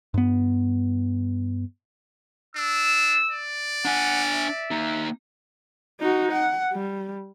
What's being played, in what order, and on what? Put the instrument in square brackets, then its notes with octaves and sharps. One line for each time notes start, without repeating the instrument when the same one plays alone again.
[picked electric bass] G2 B3
[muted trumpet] D4 [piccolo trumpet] E6
[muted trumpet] D5
[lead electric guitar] D4 G#5 [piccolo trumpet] F#5
[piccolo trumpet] E5
[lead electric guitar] A#3 D#4
[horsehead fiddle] D#4 F#4
F#5
G3